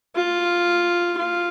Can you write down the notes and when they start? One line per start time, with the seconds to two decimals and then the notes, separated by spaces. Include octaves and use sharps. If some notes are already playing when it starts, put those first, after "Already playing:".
0.15 F4
1.17 F4